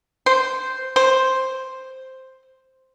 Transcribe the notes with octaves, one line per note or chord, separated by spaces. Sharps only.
C5
C5